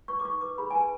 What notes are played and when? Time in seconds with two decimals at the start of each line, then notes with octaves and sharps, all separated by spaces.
0.08 B4 C#6
0.19 D6
0.24 D#4 C#6
0.41 B4 D6
0.58 G#4 B5
0.70 G#5
0.75 B4 A5